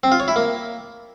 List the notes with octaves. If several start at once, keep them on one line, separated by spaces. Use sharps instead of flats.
C4
F4
C#5
E4
A#3